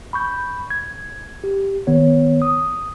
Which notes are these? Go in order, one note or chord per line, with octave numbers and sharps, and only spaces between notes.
B5 C#6 G6
G#6
G4
D#3 B3 C#5
D#6